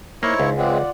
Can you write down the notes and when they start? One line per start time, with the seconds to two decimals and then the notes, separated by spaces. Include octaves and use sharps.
0.23 A#3 D#4 E4 C5 C#5
0.40 C#2
0.58 G#3 C4 F4 D5 F#5